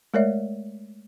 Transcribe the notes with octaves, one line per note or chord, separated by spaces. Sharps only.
G#3 A3 A#4 C#5 D5 E5